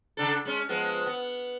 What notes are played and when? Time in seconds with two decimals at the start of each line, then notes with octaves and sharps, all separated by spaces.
0.17 C#3 D4 A4
0.45 G#3 C#4
0.69 F3 G#3 B3
1.06 B3